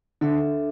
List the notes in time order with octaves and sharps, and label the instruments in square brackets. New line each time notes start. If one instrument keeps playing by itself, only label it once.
[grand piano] D3 [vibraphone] D4 A4 E5